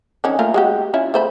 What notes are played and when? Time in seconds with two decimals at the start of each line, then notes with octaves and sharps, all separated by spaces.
0.24 D#3 C#4 D4
0.39 A3 A#3 F4
0.54 G#3 F#4 G4
0.94 C#4 E4 F4
1.14 A3 C5 B5